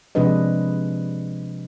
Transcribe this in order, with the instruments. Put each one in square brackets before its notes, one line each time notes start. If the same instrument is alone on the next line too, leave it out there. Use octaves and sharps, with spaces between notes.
[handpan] C3 F3 G#3 D4 B4 D#5